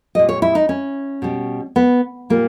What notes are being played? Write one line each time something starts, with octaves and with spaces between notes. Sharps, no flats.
A#2 G3 D#5
C#5
E4
D#4
C#4
B2 G3
B3
A#2 G3 A#3